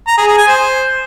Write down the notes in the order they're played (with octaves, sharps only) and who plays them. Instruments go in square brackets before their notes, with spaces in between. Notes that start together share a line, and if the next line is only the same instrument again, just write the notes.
[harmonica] A#5
G#4
G#4
G#5
C5